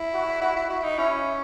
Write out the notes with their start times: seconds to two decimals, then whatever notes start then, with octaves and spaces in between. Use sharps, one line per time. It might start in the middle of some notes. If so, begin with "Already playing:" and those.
Already playing: E4
0.14 F#4
0.41 E4 F#4
0.56 E4
0.69 E4 F#4
0.83 D#4
0.98 C#4 E4